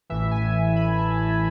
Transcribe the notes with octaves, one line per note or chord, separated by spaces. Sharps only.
A1 A2 E3 E5
G#5
B5
A5